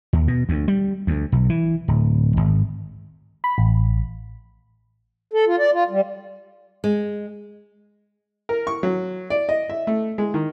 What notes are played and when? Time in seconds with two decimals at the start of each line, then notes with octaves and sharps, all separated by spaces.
0.13 D#2
0.28 B2
0.49 D2
0.68 G3
1.07 D2
1.32 B1
1.50 E3
1.88 D1
2.37 G#1
3.44 B5
3.58 A1
5.33 A4
5.47 F4
5.59 D5
5.73 F4
5.90 G3
6.84 G#3
8.49 A#4
8.67 C#6
8.83 F#3
9.30 D5
9.49 D#5
9.69 E5
9.87 A3
10.18 G#3
10.34 D#3